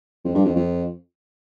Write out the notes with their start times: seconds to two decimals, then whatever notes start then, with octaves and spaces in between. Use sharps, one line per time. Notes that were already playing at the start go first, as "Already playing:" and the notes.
0.25 F2
0.35 G2
0.45 F2
0.56 F2